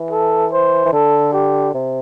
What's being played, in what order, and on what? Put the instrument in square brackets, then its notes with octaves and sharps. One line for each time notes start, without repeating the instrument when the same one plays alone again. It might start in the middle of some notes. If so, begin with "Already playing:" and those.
Already playing: [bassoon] E3
[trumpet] A4
C5
[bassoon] E3
[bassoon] D3 [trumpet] A4
[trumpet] G4
[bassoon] C3